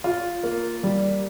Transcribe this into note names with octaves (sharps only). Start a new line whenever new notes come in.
F4
A#3
G3